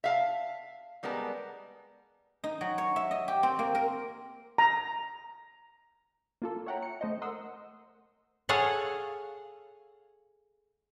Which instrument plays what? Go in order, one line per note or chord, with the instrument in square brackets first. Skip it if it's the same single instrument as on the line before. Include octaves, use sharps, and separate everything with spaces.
[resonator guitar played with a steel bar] E5 F5 A5
G3 G#3 B3 A#4 A5
[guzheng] D#4
F#3
C#5
E5
D#5
G4
C4
A#3
A#4
[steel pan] A#5
[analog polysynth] A#3 F4 A4
C#5 E5 F#5 G5 A#5
C#7
A3 C5 D#5
A#4 F#5 C6 D#6 E6
[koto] G#4 A4 C#5 F5 F#5